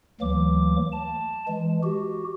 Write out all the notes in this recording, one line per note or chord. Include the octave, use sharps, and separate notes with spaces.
D2 E3 F#3 A#3 D6
A5
E3 G#3
F#4 G4